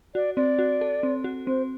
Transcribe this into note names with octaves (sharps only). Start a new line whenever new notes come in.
F#4 D5
C4 D5
F#4
A4
C4
F#4
C4 C5